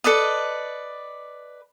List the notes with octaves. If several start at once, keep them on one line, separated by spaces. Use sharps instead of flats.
A4 B4 D5 D#5